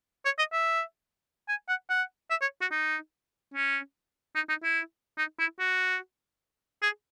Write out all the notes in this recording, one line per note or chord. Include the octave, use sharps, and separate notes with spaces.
C#5
D#5
E5
G#5
F#5
F#5
E5
C#5
F#4
D#4
C#4
D#4
D#4
E4
D#4
E4
F#4
G#4